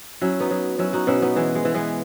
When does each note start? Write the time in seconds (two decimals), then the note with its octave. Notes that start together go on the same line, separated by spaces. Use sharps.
0.21 F#3 C#4 E4
0.40 B3 D#4
0.51 F#3
0.79 F#3 C#4 E4
0.93 D#4 F#4
1.07 B2 C#4 E4
1.22 B3 D#4
1.36 E3 G#3
1.55 G#3
1.65 E3
1.74 G#3 B3